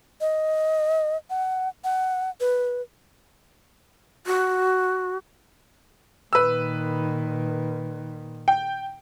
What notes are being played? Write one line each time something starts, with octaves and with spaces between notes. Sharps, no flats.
D#5
F#5
F#5
B4
F#4
A#2 D#3 B4 E6
G5